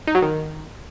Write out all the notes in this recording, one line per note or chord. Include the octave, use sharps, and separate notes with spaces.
D#4
F#3
D#3